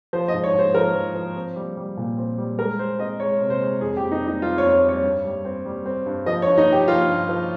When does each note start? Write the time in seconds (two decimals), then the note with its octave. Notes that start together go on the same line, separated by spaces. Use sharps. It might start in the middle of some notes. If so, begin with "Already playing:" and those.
0.13 F3 C5
0.28 G#2 D#5
0.44 C#5
0.54 G#2
0.59 C5
0.75 F3 A#4
0.95 F3
1.15 F3
1.36 C4
1.56 G3
1.77 G3
1.97 A#2
2.18 C4
2.38 G3
2.59 G#3 A#4
2.79 G#3 C5
2.99 C4 D#5
3.20 G#3 C#5
3.41 C3
3.50 C5
3.61 G#3
3.81 F2 G#4
3.97 G4
4.02 F2
4.12 D#4
4.22 G3
4.27 D#4
4.42 F2 F4
4.58 C#5
4.63 F2
4.73 C#5
4.84 G3
4.89 C#5
5.04 G2
5.24 G3
5.45 C4
5.66 G3
5.86 C4
6.06 G2
6.26 F3 D#5
6.42 G2 C#5
6.58 D#4
6.68 F3 G4
6.88 F3 F4
7.08 G2
7.29 F3